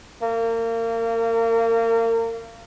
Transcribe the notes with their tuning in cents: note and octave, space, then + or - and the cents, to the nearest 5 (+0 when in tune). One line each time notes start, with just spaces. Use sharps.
A#3 -30